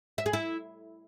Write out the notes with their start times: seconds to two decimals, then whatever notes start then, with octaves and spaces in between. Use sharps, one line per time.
0.18 E5
0.26 G#4
0.33 E4